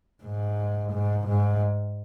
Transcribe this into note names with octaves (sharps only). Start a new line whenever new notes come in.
G#2
G#2
G#2